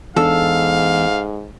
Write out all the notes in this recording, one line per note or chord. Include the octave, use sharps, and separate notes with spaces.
E2 G#2 D4 A4 F5